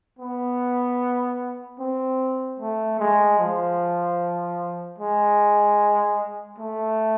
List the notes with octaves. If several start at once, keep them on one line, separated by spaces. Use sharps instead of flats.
B3
C4
A3
G#3
F3
G#3
A3